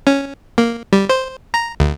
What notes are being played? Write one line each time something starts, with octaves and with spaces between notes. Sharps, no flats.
C#4
A#3
G3
C5
A#5
D2